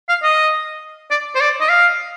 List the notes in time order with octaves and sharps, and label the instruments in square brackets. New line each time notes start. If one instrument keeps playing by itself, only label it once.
[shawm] F5
D#5
D5
C5
D5
D#5
F5